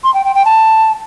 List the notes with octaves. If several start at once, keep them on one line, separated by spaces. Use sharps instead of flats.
C6
G5
G5
G5
A5